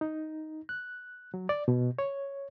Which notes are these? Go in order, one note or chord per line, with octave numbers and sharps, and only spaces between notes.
D#4
F#6
F#3
D5
B2
C#5